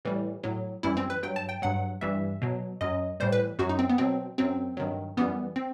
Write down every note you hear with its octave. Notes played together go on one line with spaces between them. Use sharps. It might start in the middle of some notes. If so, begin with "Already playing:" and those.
A2 E3 G3
A2 F#3
F#2 E3 G3 E4
C4
B4
G2 F#3 G5
A5
G5
G2 F#3 F#5
G2 E3 G3 E5
B2 F#3
F#2 F#3 D#5
A2 E3 G3 C5
B4
F#2 F#3 F#4
D#4
C4
B3
B2 F#3 C4
F#2 F#3 C4
G2 D#3 F#3
F#2 E3 G3 B3
C4